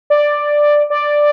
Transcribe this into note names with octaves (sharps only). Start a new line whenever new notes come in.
D5
D5